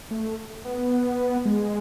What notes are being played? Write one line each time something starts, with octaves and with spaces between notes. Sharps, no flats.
A3
B3
G#3